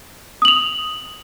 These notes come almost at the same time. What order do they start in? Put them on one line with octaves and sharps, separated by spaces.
D#6 F#7 F7